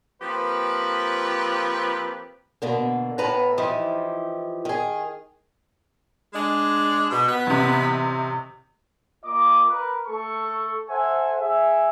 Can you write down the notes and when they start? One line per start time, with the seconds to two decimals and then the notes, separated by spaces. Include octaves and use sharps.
0.21 F3 A#3 C4 G4 B4
2.62 B2 D3 A#3
3.18 A2 B3 B4 A5 A#5
3.58 E3 F3 D#4 E4 G4
4.65 D#3 G#4
6.33 G#3 D4
7.10 B2
7.27 B3 B4
7.47 A1 C3
9.23 A#3 F4 D#5 D6
9.69 A#4 B4
10.08 A3 A4 C#6
10.89 A4 C5 E5 F#5 G#5
11.40 G#4 E5